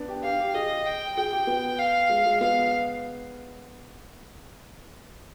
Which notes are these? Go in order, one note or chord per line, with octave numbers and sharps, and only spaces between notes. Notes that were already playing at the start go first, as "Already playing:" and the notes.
Already playing: B3 D4
G4
G4 F5
G4
G#4 D#5
G5
G#4 G5
G4
B3
F5
G#3
G#3
B3 F5